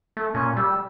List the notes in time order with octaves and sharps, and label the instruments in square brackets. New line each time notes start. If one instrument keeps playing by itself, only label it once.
[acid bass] A3
[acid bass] A#2 [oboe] C#4
[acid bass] G3 [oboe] E6